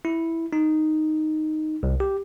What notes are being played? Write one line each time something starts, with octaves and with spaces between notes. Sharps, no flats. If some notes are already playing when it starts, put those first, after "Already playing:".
E4
D#4
C2
G4